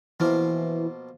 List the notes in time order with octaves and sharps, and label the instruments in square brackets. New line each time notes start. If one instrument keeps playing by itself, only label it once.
[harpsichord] B2 F3 A#3 [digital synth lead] E3